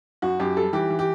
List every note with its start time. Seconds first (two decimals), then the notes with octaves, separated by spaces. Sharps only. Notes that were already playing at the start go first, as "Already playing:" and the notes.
0.22 F#2 F#4
0.40 F#2 G4
0.56 G3 A4
0.73 E3 G4
0.90 E3
0.99 G4